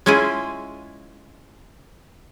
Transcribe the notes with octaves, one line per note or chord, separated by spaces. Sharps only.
G#3 C#4 E4 F4 G#4